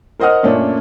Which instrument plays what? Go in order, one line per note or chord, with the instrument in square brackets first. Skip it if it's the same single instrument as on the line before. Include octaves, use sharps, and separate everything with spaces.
[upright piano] A#4 C5 D#5 F#5 D#6 F6
F#2 A#2 A3 C#4 D4